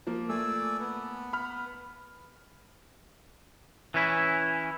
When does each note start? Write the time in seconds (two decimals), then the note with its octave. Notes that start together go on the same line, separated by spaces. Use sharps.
0.07 F3 A#3
0.29 A3 D5 G#5 E6
0.79 B3
1.33 B5 F6
3.94 E3 C#4 E4